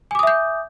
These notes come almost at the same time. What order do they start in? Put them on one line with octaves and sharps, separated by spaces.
G#5 D6 D#6 E5 G6